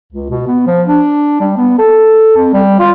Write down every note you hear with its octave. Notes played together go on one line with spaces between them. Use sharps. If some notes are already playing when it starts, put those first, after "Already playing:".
C#2
B2
B3
F3
D4
G3
B3
A4
F2
G3
F4